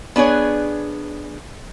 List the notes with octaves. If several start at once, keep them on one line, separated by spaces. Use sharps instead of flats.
B3 D4 G#4 C#5